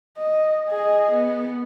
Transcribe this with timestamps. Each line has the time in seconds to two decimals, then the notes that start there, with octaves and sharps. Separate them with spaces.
0.18 D#5
0.69 G#4 D#5
1.11 B3